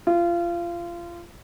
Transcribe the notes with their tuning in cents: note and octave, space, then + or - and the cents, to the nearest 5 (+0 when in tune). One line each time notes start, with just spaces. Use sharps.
F4 -25